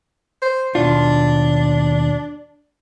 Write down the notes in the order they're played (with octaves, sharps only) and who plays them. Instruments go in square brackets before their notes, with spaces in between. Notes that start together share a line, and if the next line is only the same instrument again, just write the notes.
[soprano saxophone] C5
[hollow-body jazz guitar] D#2 B2 F4 [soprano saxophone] D4